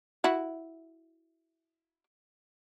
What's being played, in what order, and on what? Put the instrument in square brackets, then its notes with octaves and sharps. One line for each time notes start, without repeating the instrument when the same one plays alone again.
[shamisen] E4 F#4